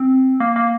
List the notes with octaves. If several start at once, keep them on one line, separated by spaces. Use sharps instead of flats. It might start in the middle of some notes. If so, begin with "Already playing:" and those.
Already playing: C4
A#3
A#3